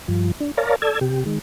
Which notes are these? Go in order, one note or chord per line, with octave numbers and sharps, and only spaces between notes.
G2 F3
D4
A#4 C#5 D5 F5 A5 A#5
A4 D5 A5 E6 G#6
C3 G4
D#3 G#3